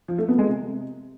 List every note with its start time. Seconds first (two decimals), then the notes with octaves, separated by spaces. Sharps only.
0.08 F3
0.18 A3
0.29 B3
0.39 G#3
0.49 C3